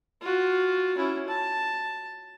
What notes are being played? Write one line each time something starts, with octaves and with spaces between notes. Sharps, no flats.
F4 F#4
C#4 E4
A5